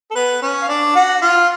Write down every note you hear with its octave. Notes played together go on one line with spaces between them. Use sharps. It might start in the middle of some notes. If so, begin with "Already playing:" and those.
A4
B3 B4
C#4 C#5
F5
D4 D5
F#4 F#5
F4 F5